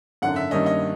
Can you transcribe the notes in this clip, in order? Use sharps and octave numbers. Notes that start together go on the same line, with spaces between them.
G#1 F#2 D3 F#5
E5
G2 D#3 G3 A#3 C#4 D#5
D#5